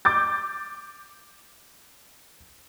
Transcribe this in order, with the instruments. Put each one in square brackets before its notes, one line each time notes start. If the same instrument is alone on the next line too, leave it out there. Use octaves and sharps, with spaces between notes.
[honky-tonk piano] D6 G6 A6